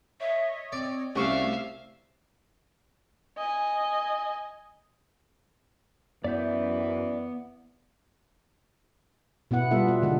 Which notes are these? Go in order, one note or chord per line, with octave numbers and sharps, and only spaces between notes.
C#5 D#5 E5
C4 D5
C2 A3 C#4 F#4 D5 E5 F5 C#6
D#5 G#5
F#2 E3 B3 D5 E5 G6
B2 B3 E4 F#5
G3 B3 F4 A4 E5
B3
D3 G#3 F4